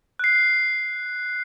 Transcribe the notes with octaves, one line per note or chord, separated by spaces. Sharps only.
F#6 C7